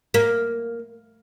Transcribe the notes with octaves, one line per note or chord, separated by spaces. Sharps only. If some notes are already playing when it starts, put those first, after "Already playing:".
A#3